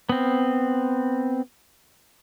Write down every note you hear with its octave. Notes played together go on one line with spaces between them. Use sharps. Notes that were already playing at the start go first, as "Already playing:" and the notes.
B3 C4